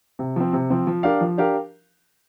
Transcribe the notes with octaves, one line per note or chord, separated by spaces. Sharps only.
C3
F3 C4
C3
F3 C4
F3
D4 G4 A#4 F5
F3
D4 G4 A#4 F5